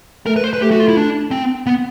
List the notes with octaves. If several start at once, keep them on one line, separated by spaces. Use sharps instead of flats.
A3 A#4
B4
C5
B4
A3 G4
F#4
F4
E4
D4
C4
B3